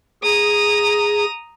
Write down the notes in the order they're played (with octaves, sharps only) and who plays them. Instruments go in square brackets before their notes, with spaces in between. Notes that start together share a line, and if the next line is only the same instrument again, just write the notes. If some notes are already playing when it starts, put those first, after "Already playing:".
[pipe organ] G#4 [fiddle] A#5 D#6